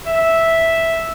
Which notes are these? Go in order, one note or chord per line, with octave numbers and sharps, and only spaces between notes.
E5